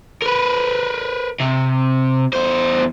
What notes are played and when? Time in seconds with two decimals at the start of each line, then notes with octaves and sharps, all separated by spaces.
0.22 A#4 B4
1.40 C3
2.33 E2 C5